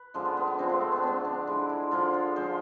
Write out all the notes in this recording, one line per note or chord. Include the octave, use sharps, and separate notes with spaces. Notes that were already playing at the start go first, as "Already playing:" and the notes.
Already playing: B4
D3 F3 G#3 D4
B3
B3
D4
D3 F3 G#3 C4
B3
A3
B3
D3 G#3 C4
D4
D3 G#3 E4
E4
D3 F3 G#3 F4
A4
D3 F3 G#3 C5